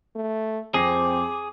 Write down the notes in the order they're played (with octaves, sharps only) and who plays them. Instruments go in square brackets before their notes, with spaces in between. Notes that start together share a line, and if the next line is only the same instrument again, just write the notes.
[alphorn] A3
[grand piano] F2 A#6 C7 [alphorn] C4 [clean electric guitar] G#4 [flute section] D6